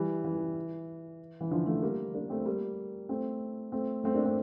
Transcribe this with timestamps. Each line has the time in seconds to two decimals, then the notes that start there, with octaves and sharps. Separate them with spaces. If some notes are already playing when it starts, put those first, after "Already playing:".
Already playing: E3 G3
0.24 E3
1.41 E3
1.51 D3 F3
1.66 F3 A3
1.82 G3 A#3
2.14 A#3 D4
2.30 A3 C4
2.45 G3 A#3
3.09 A3 C4
3.72 A3 C4
4.04 A3 C4
4.15 A#3 D4
4.25 A3 C4